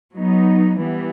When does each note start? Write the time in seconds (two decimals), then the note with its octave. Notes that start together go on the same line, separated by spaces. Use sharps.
0.15 F#3 B3 D#4
0.80 E3 G3 B3